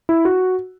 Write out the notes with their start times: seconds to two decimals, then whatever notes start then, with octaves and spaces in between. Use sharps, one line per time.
0.09 E4
0.25 F#4